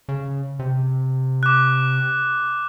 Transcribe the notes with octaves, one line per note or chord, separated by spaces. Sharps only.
C#3
C3
D6 F#6